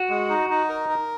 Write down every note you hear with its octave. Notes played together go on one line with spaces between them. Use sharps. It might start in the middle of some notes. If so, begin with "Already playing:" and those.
Already playing: F#4
G#3
D#4
D#4
A#4
A#4